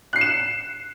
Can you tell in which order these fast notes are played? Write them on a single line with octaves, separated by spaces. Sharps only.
F#6 C7 C#7 E7